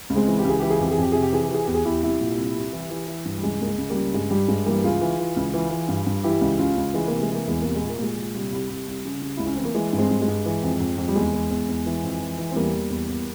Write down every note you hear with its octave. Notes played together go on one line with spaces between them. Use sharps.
C#2
G#3 C4
E3
G4
C#2 G#4
E3 G4
G#4
F2 G4
G#4
F2 G4
C3 G#4
G4
E3 G#4
G4
E3 G#4
E2 G4
G#4
E2 E4 G4
C2 E4 G4
A#2
C2
C2
E3
E3
E3
G2
G3
C#2 G#3
C#2 A#3
G#3
C#2
G3 A#3
C#3
G2 G#3
G2 G3
G2 G#3
E3 G3 A#3
C#2 F4 G#4
E3
E3
C#2
E3
E3
G2
G2
E3 E4 G4
C#2
C#2 C#4 F4
C#2
E3 G#3
C3 A#3
G#3
E3 A#3
E2 G#3
C2 A#3
G#3
A#2
A#3
A#2 G#3
A#2
C3 G3
C2
C2
C2
C#3
C#3
C#2 E4
C#4
E3 C4
A#3
E3 G#3
G2
G#3 C4
G2
G#3
G2
E3
F2
F2
F2
G3
E2 G#3
E2
E2
E2
E3
F2
E3
E3
C4
E2 G3 A#3
E2
E2
E2